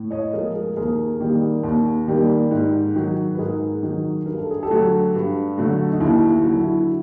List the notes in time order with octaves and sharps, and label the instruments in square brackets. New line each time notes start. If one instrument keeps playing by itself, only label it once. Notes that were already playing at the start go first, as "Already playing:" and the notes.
Already playing: [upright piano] A2
C#5 D#5
F3 G#3 G#4 A#4
G#4 A#4
D#2 G#4 A#4
D#3 G3 A#3
D#2
D#3 G3 A#3
G#2
D#3 F#3
B4
G#2 G#4 A#4
D#3 F#3
G2 A#4
A4
G#4
G4 A4
D3 F#3 A3
G2
D3 F#3 A3
D#4
D#2 E4
E4
D3 F#3
E4